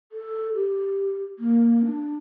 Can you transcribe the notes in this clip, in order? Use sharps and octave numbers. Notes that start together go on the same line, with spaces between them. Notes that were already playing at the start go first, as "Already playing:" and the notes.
A4
G4
A#3
D4